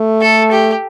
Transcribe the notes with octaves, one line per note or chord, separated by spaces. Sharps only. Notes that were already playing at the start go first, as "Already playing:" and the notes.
Already playing: A3
A4
G4